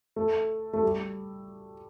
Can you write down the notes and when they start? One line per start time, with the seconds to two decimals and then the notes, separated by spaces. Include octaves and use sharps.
0.16 A3
0.73 A3
0.83 G3